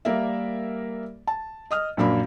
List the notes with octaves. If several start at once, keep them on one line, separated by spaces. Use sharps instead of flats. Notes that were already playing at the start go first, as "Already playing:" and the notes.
G3 A#3 A#4 D5 E5
A5
D#5 D#6 F6
A#1 F#2 A#3 D4 B5